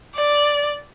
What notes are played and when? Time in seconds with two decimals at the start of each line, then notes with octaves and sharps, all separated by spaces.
0.16 D5